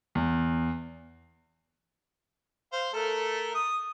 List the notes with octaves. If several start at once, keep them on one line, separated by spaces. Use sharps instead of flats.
E2
C5 F5
A3 A4 A#4
D#6